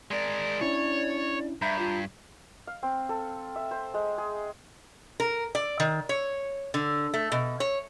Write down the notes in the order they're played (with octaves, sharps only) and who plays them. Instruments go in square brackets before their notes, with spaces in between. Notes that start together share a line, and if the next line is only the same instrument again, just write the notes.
[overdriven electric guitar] G#3 A#4 [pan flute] D5
[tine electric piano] C#4 D4 E4 [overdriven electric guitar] C#5
[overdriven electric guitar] G2 [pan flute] E5 [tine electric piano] A#5 B5 G6
[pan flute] F4
[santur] F5
C4
A4
E5
C5
G#3
G#4
[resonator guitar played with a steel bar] A#4
D5
D#3
C#5
D3
A3
B2
C#5